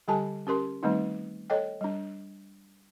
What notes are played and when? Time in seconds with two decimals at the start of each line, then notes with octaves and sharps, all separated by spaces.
0.08 D3 G3 G4 A4 G#5 A5
0.47 C#4 G4 A#4 C6
0.83 D#3 G3 A3 C4 D#4
1.50 A4 C#5 D#5 G5
1.81 G3 D4